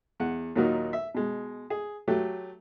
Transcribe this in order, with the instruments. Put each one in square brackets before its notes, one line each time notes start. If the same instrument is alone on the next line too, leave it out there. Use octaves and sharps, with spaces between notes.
[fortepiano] E2 F#5
D#2 A#2 F#3 D#4 F#4 A#4
E5
B2 G#3
G#4
F#3 A3 G4